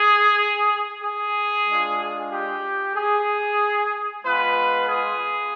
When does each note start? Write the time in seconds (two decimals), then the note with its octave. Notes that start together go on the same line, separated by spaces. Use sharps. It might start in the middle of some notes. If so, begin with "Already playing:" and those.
Already playing: G#4
1.03 G#4
1.68 G#3 D4 F4
2.32 G4
2.95 G#4
4.24 G#3 B3 F4 B4
4.88 G#4